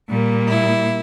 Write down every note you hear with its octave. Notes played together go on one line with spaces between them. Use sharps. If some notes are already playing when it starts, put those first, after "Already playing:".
A#2 G3 A#3
E4